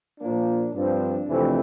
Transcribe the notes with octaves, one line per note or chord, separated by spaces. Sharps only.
A#2 F3 A#3 D4
G2 F3 C4 D4
F2 C3 E3 A3 C4